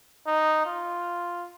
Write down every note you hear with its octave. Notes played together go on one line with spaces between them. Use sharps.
D#4
F4